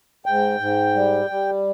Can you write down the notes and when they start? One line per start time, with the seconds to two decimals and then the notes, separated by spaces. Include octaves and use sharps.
0.26 G#2 G5
0.60 G#2
0.95 G3
1.30 G3